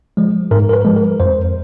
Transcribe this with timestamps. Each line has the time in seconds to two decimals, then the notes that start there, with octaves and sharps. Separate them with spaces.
0.17 F3 G#3
0.51 G#2 A#4
0.69 A#4
0.73 B4
0.85 F3 G#3
0.96 A#4
1.20 F2 C5